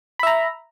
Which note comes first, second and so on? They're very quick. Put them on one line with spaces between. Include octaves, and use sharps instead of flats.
B5 E5 A#5